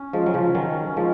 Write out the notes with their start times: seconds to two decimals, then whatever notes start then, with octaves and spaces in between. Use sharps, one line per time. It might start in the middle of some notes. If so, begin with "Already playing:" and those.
Already playing: C#4
0.13 F3 G#3
0.26 F#3
0.34 C#3 F3
0.55 D#3 F#3
0.97 F3 G#3